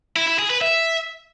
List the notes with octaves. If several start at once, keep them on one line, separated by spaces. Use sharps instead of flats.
E4
E4
G#4
B4
E5